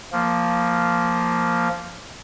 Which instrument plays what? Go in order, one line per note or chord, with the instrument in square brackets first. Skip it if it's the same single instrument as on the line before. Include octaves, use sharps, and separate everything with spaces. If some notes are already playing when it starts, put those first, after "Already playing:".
[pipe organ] F3 A#3